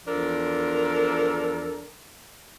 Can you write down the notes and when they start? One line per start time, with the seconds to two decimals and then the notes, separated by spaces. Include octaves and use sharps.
0.05 E2 F3 D4 A4 A#4